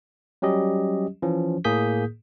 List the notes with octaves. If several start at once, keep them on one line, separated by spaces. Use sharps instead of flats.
F#3 G3 C#4 G4 D#5
E3 F3 C#4
A2 A#3 G#4 D#6 G6 B6